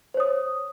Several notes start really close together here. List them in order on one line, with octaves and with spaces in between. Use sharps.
C5 C#5 D#6